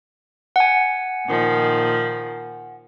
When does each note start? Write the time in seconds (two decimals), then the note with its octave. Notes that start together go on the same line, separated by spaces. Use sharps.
0.56 F#5 G#5
1.25 A#2 D#3 F3